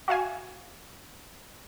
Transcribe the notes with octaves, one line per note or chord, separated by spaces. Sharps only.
F#4 E5 F5 G#5